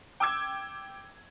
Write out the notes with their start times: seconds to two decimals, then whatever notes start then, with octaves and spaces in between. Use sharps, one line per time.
0.20 G5 D6 E6 G#6